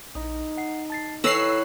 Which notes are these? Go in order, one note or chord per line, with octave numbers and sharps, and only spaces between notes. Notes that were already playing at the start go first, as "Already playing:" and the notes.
A#1 D#4
F#5 C7
A5 A6 C7
E3 A4 B4 C#5 F#5 E6 A#6 C7